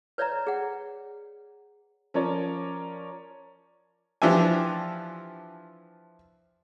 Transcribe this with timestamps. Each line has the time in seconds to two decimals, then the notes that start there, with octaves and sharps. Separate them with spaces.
0.18 B4 C#5 D5 E5 A#5
0.47 G#4 F#5
2.14 F3 C#4 A#4 C#5 D5
4.22 E3 F3 D4 G4 E5 G#5